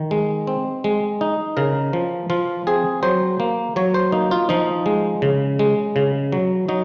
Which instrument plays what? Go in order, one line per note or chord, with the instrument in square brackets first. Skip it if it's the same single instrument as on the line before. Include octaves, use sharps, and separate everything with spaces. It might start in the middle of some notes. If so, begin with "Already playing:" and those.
Already playing: [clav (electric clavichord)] D#3
G#3
C4
G#3
D#4
C#3 A#4
F3
F3 F4
C4 G#4
F#3 C5
A#3
F#3 C#5
C5
A#3 D#4
F4
F3 D#4
G#3
C#3
G#3
C#3
F#3
F#3 D#4